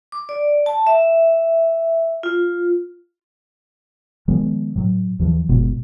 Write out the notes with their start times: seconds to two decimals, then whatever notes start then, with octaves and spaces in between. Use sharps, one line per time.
0.12 D6
0.29 D5
0.66 A5
0.87 E5
2.23 F4
4.28 D#3 F3 G#3 B3
4.76 A2 F#3
5.19 D#2 E3 F3
5.49 G1 B2 G#3 B3